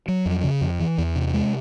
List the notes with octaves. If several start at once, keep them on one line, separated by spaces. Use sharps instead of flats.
F#3
F2
C#3
F2
E3
E2
C3
G#3